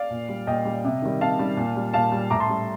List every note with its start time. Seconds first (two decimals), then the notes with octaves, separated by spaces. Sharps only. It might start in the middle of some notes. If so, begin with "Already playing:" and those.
Already playing: D5 F5
0.10 A#2
0.29 G3
0.47 A#2 D#5 G5
0.65 G3
0.84 C3
1.02 D#3 G3
1.20 C3 F5 A5
1.39 D#3 G3
1.57 A#2
1.76 G3
1.94 A#2 F5 A5
2.12 G3
2.30 A2 A#5 D6
2.40 A5 C6
2.49 G3